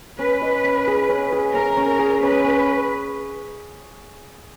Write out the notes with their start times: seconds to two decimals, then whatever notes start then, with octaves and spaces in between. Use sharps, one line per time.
0.19 C#4 B4
0.42 D#5
0.64 C#4
0.87 G#4
1.09 C#4
1.32 G#4
1.54 C#4 A#4
1.77 C#4
1.99 G#4
2.22 C#4 B4
2.44 C#4